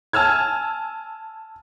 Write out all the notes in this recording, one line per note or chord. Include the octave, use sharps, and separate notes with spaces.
G#5 A5 E6 F6 G#6